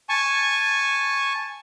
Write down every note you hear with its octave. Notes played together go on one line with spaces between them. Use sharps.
G#5 A5 C#6